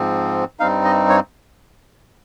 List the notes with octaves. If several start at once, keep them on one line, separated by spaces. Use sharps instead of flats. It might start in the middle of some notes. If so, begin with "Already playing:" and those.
Already playing: G#2 F3 C4
G2 G3 C4 D#4 F5
D#5
C#5